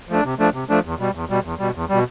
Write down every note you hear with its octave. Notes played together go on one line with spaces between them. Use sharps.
F3 A3 D4
C3
F3 A3 D4
C3
F3 A3 D4
E2
B2 G3
E2
B2 G3
E2
B2 G3
E2
B2 G3